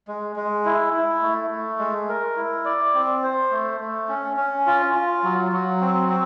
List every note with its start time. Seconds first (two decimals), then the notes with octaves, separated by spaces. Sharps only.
0.08 G#3
0.36 G#3
0.65 E4
0.93 E4
1.22 A3
1.50 A3
1.79 G#3
2.09 A#4
2.36 E4
2.65 D5
2.94 C4
3.23 C5
3.51 A3
3.80 A3
4.08 C#4
4.37 C#4
4.66 F4
4.94 F4
5.24 F#3
5.52 F#3
5.81 C4
6.09 C4